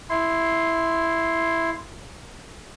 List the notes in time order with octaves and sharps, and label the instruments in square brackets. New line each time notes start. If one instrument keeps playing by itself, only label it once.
[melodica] E4 C6